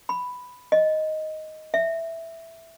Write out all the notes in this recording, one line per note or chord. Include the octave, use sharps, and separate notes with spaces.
B5
D#5
E5